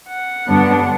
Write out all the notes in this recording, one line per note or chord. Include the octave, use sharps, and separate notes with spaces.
F#5
G2 D3 G3 B3 D4